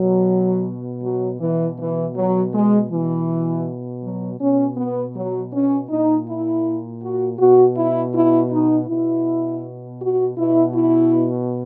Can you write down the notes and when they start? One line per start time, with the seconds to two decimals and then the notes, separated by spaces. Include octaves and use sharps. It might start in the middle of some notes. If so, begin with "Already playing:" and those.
Already playing: B2 F#3
1.04 F#3
1.41 B2 E3
1.79 E3
2.16 F#3
2.53 G#3
2.91 B2 E3
4.03 F#3
4.40 B2 C#4
4.77 B3
5.15 F#3
5.53 C#4
5.90 A#2 D#4
6.27 E4
7.02 F#4
7.38 B2 F#4
7.77 E4
8.14 E4
8.51 D#4
8.88 B2 E4
10.01 F#4
10.37 B2 E4
10.75 E4